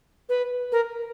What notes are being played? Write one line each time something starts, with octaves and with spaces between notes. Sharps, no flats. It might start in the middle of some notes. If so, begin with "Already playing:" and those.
B4
A#4